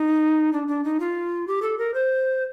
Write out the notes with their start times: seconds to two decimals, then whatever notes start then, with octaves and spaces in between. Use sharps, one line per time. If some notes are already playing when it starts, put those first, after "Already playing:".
Already playing: D#4
0.53 D4
0.68 D4
0.84 D#4
1.00 F4
1.48 G4
1.62 A4
1.78 A#4
1.94 C5